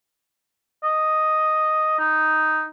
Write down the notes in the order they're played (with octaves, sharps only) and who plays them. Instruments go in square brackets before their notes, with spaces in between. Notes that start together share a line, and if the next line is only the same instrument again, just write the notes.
[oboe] D#5
D#4